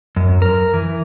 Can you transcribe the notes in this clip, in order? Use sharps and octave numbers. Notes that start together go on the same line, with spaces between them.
F#2
A#4
E3